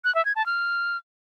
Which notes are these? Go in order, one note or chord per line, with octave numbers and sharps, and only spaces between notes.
F#6
E5
G#6
A5
F6